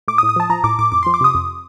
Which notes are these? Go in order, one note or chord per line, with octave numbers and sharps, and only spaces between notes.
A2 D6
D#6
A2
D#6
F3 A5
F3 A#5
A2 D6
A2 D6
F2 D6
F3 C6
D6
C3 D#6
F2